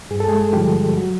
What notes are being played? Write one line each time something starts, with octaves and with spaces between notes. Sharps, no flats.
G2 G#4
A4
G#3 G#4
D3 F3 G3 G4
F#3 F#4